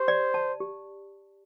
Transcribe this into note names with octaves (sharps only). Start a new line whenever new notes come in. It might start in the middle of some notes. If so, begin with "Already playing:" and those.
Already playing: G4 C5
D5
A5
G4